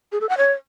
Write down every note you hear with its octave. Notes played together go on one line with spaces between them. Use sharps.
G#4
A4
F#5
C#5